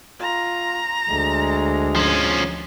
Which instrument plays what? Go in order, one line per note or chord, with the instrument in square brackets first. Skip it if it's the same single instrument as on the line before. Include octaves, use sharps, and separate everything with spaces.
[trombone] F4 [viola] A#5
[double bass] D2 [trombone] G#3
[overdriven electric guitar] F3 C#4